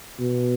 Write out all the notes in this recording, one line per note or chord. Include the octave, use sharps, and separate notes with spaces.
B2